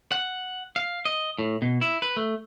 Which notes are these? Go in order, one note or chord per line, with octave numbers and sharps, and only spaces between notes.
F#5
F5
D#5
A2
B2
E4
B4
A3